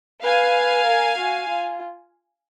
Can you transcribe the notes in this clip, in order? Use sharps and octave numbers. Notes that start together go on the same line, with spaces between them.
B4 F5 G#5
A#4
F#4
F4